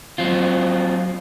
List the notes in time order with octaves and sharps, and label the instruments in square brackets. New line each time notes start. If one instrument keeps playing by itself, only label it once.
[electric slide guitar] F#3 C4 F4